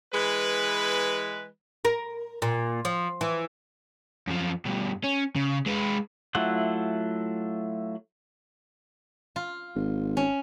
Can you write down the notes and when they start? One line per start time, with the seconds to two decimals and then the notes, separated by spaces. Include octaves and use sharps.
0.13 E3 G#3 B4
1.85 A#4
2.42 A#2
2.85 F3
3.21 E3
4.28 F#2 F3
4.66 G2 B2
5.04 C#4
5.36 C#3
5.66 G#3 B4
6.35 F#3 A3 E4 F4 F#5
9.36 F4
9.75 G#1
10.17 C#4